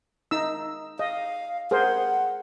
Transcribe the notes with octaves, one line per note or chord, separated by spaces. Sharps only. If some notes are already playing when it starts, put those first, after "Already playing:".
D#4 E6
D#5 F5
G#4 A#4 C5 F#5